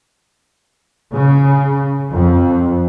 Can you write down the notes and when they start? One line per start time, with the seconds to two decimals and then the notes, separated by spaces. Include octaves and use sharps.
1.13 C#3
2.11 F2